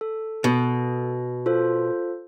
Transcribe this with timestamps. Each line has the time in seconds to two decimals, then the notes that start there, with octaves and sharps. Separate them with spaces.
0.01 A4
0.44 B2
1.46 F4 A4 C5